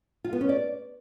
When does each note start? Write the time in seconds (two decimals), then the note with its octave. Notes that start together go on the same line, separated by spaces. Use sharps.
0.24 F4
0.33 B3
0.41 C#4
0.49 D5